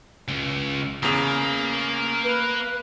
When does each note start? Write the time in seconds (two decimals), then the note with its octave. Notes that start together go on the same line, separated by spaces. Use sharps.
0.28 C#2
1.03 E2 C#3 A#3
2.23 B4